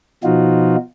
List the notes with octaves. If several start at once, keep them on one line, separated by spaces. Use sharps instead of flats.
B2 F3 D#4 F4 F#4